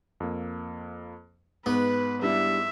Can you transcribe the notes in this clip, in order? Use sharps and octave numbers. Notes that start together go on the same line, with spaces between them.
F2 A#3
G#2 B3 B4
G3 D4 E4 E5